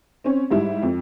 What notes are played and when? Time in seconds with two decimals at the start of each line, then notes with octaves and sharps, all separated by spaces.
0.24 C4 C#4
0.51 G#2 G3 E4
0.83 F2